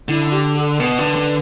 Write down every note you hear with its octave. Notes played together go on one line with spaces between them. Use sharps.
D3 E4
G4
A4
A4
B2 B4
D3
D3